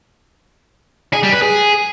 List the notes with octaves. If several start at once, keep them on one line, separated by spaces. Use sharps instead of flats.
G#4
G3
B4
G#4